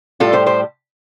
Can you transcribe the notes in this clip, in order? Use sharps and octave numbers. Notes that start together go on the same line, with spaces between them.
A2 G3 F4 A4
G4 C5
G4 C5